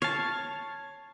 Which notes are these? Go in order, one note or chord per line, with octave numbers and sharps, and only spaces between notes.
C#5 F5 A5